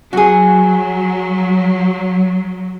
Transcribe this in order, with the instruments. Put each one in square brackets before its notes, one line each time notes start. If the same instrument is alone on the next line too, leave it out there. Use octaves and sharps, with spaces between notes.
[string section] F#3 [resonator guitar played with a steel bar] F#4 G#4